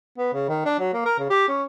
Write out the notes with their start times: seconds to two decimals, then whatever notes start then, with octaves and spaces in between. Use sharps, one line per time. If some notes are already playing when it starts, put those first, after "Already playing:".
0.18 B3
0.33 C#3
0.48 D#3
0.65 D4
0.79 F#3
0.94 A#3
1.05 A#4
1.19 C#3
1.30 G4
1.48 C#4